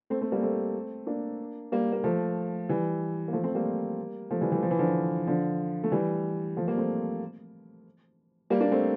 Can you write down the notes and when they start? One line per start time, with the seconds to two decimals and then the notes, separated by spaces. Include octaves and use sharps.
0.10 A3 C4
0.21 A3 C4
0.32 G3 A#3
0.42 A3 C4
1.07 A#3 D4
1.72 G3 A#3
1.92 A#3
2.04 F3 A3
2.69 E3 G3
3.28 A#3
3.33 F3 A3
3.44 A3 C4
3.55 G3 A#3
4.31 F3 A3
4.41 E3 G3
4.52 E3 G3
4.63 F3
4.71 E3
4.79 D3 F3
5.27 D3 F3
5.84 A3
5.92 E3 G3
6.56 F3 A3
6.68 G3 A#3
6.77 A3 C4
8.50 G3 A#3
8.60 A#3 D4
8.71 A3 C4